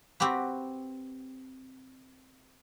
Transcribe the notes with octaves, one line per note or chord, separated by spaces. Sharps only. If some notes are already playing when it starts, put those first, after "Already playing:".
C4 F#4 G4 B4